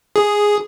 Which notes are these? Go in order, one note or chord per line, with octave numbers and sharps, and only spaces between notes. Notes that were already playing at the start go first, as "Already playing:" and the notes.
G#4